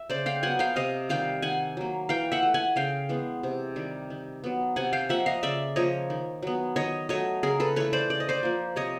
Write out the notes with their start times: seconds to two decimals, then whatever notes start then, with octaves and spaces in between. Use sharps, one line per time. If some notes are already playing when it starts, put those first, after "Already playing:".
Already playing: E5
0.10 C#3 C5 D5
0.26 F5 G5
0.43 F#3 B3 F#5 G#5
0.59 F5 G5
0.76 C3 D#5 F5
1.09 D#3 G3 F5 G5
1.42 D#3 F#5 G#5
1.77 F#3 A#3
2.09 E3 F5 G5
2.32 E5 F#5
2.43 A3
2.54 F#5 G#5
2.76 C#3 F5 G5
3.09 E3 G#3 B3
3.43 C3
3.76 D#3 G3
4.10 D#3
4.44 F#3 B3
4.76 C3 F#5 G#5
4.93 F5 G5
5.09 F3 A#3 E5 F#5
5.26 D#5 F5
5.43 C#3 D5 E5
5.76 F3 A#3 C#5 D#5
6.10 D#3
6.43 F#3 B3
6.76 D#3 C#5 D#5
7.09 F#3 A3 C#5 D#5
7.43 C#3 G#4 A#4
7.60 A4 B4
7.76 E3 A3 B4 C#5
7.93 C5 D5
8.09 C#3 D5
8.20 D#5
8.29 C5 D5
8.43 F3 A#3
8.76 C3 C#5 D#5